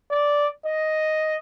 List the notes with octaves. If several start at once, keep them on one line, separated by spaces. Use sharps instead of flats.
D5
D#5